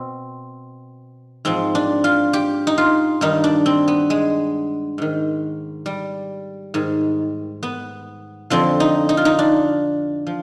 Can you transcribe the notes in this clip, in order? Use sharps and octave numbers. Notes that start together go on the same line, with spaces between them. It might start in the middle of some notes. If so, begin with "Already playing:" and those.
Already playing: B2 C4
G#2 F3 C4
D4
F4
G4
D#4
F4
G2 D#3 D#4
D4
C4
B3
G#3
G#2 D#3
G3
G#2 D#3
B3
F2 D3 F3 C4
D#4
D#4
F4
D#4
D4
F3